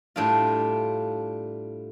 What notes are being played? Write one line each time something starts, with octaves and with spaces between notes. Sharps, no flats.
A2 G3 D4 F4